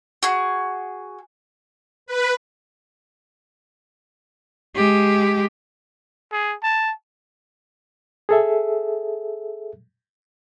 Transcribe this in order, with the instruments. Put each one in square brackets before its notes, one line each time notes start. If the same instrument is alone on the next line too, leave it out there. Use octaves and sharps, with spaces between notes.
[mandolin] F#4 G#4
[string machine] B4
[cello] G#3 G4
[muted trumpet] G#4
A5
[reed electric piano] G#4 A4 E5